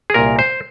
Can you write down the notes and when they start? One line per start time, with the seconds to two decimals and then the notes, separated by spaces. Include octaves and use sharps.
0.10 G#4
0.14 C2 A#2 A#4
0.39 C5